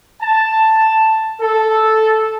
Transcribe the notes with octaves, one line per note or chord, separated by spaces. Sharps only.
A5
A4